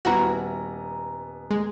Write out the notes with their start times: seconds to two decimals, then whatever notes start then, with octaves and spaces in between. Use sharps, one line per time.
0.05 D#1 B3 E4 F#4 A#5
1.51 G#3